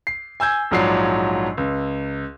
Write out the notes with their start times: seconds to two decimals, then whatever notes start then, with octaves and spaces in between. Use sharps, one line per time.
0.07 C7
0.40 G#5 E6 G6 G#6
0.71 A#1 G#2 F3 F#3 D5 C7
1.57 C#2